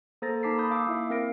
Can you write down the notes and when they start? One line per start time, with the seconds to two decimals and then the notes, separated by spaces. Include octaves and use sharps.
0.22 A#3 A4 C5 A#5 A6 A#6
0.43 A#3 D#4 A5 D6 B6 C7
0.58 B5 D#6 G6
0.71 F5 D6 E6
0.87 A#3 E4 E5
1.10 C4 A#4 F5 A#6 D7